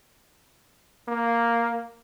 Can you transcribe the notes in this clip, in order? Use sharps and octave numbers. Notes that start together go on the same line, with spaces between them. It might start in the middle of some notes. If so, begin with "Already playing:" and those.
A#3